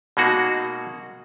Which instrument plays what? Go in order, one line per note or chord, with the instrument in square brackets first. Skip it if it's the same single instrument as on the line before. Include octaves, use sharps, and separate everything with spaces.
[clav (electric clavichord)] B2 G#3 A#3 D#4 F#4 G#4